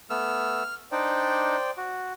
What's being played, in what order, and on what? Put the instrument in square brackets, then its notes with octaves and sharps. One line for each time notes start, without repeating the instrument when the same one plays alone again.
[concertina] A3 B3 E6 [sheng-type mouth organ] F6
[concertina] D4 D#4 [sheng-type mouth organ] C5 D5 G5
[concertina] F#4